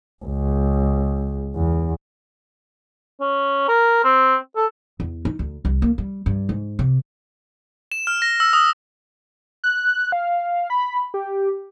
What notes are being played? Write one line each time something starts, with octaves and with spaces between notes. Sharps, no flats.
C#2
E2
C#4
A#4
C4
A4
E2
D#4
D2
C2
A#3
G3
G2
G#2
C3
E7
F6
A#6
E6
D#6
F#6
F5
B5
G4